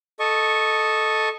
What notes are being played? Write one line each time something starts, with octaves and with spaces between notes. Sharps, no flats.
A4 D#5 C#6